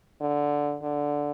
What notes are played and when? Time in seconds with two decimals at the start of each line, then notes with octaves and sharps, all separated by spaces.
0.21 D3
0.83 D3